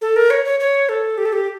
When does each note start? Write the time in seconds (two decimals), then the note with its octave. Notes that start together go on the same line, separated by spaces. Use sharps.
0.01 A4
0.16 A#4
0.30 C#5
0.45 C#5
0.60 C#5
0.89 A4
1.18 G4
1.25 A4
1.33 G4